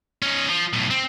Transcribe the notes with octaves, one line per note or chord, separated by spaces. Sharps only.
C#4 D#4
F3
B1 A2
C4